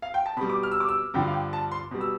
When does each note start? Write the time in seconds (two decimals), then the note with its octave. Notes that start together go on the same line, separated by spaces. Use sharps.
0.02 F5
0.14 G5
0.26 A5
0.37 B2 B5
0.41 G3
0.49 D6
0.63 F6
0.71 E6
0.80 D6
0.88 E6
1.14 G2 D3 F3 G5
1.27 F5
1.33 G5
1.53 A5
1.71 C6
1.91 B2 G3
2.01 E6